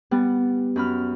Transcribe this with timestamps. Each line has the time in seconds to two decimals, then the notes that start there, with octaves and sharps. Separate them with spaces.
0.11 G3 B3
0.76 F#2 B5 F6